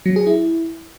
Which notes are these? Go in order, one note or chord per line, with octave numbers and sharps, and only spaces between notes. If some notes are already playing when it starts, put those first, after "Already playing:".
F#3
G#4
E4